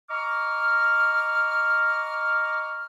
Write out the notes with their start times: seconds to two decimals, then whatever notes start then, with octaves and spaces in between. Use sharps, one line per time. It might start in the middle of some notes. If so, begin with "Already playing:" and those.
0.10 D#5 A#5 C#6 D6 F6